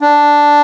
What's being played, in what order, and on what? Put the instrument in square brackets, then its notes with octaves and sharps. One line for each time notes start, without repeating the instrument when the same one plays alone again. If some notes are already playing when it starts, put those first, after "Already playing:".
[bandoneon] D4